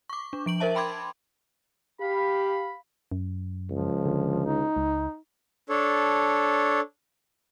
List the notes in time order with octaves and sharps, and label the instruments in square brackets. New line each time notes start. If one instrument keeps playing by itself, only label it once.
[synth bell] C#6 D6
D4
F3 D7 F#7
A#4 C5 E5 A5
G5 B5 C6 D6 G#6
[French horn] G4 [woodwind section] F5 B5
[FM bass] F#2
[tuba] C#2 [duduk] F3
[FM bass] D3
[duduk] D#4
[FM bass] C#2
[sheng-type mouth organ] D4 A4 C#5